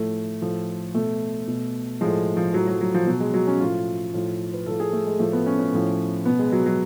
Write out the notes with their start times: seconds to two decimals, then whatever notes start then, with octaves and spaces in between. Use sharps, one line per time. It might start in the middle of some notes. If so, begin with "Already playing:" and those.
Already playing: A2 F3 A3
0.42 A2 F3
0.95 B2 A3
1.48 B2
2.01 A2 F3 G#3
2.37 F3
2.54 A2 F3 F#3
2.67 F#3
2.81 F#3
2.94 F3
3.07 B2 F#3
3.20 G#3
3.34 F#3
3.47 C#4
3.60 A2 F3 F4
4.13 A2 F3
4.53 B4
4.66 A2 F3 A4
4.80 G#4
4.93 A3
5.06 G#3
5.19 A2 F3 A3
5.33 B3
5.46 C#4
5.59 C#4
5.73 A2 F3
6.25 B2 B3
6.39 G#3
6.52 F#3
6.66 F#3